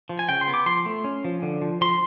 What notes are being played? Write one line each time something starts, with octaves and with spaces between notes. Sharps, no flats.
F3
G#5
C#3 G5
C6
B3
D6
F3 C6
A3
C#4
F3
D3
F3
F3 C6